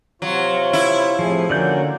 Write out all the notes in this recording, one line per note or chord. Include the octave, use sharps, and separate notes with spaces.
C3 F#3 F4 C#5
E4
A2 C3 F3 G#4
D3 A#3 C#4 F#4 D5 G6